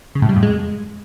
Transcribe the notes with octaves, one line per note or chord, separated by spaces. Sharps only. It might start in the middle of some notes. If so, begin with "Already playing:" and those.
C#3
A2
G3
F2
G#3